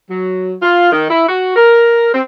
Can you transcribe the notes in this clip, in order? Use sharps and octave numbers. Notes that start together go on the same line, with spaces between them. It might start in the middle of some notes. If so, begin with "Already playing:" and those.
F#3
F4
D#3
E4
F#4
A#4
C4